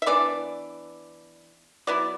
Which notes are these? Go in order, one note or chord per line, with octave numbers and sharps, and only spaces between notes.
E5
E3 B3 D4 D5
F#3 B3 E4 D5